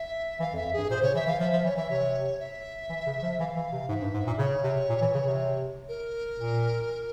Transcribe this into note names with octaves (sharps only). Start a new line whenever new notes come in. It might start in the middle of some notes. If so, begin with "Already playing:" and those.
Already playing: E5
E3 F5
F2
E5
F2
G2 G#4
A#2 C5
C#3 C#5
E3 E5
E3 F5
F3 E5
F3 E5
E3 C#5
E3 E5
C3 C#5
E5
E3
C#3
F3
E3 F5
E3
C3
G#2 E5
G2
G#2
A#2
C#3 C#5
C3
A#2
E3
C#3
C3
A#4
A#2